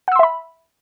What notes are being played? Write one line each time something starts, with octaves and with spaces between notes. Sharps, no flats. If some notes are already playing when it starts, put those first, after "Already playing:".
E5 F#5 B5 C6 E6